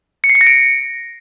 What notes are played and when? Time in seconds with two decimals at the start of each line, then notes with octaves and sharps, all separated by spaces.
0.24 C#7
0.30 C7
0.35 C#7
0.41 A#6
0.47 D7